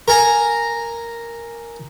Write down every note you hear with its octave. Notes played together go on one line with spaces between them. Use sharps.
A#4 G#5 A#5